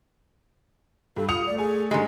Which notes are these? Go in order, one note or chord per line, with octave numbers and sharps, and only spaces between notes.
G2 A4
F4 D#6 C#7 F7
A3 D5
G#4 G#5
G#2 D3 G3 G#3 G#5